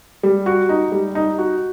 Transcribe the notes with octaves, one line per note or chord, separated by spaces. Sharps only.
G3
F#4
D#4
G3
D#4
F#4